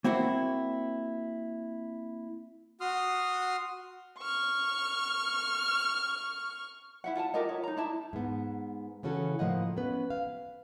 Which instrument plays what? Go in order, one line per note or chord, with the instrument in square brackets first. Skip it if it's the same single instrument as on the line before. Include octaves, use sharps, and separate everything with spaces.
[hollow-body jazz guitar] A#3 C4 E4 F#4 C5
[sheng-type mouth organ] F#4 C6 D#6 F6
[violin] C#6 F6
[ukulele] E4 E5 F#5
F4 F#5 G#5 A5
F4 G4 A#4 D#5
C#5
D#4 A#5
D4 E4 A5
[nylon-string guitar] G#2 B3
C#3 E3 C#4 F#4 A4
A2 F3 A#3 D#5 F#5
B3 C#4 B4
F5